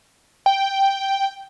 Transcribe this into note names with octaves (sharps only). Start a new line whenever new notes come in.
G5